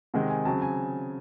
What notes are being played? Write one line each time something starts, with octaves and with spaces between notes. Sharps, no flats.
C3 D#3 G#3 C4 F#5
G#5
C#3 F#3 C4 A5
G#5